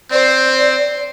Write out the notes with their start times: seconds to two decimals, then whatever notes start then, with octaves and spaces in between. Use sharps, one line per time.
0.12 C4 C5 D5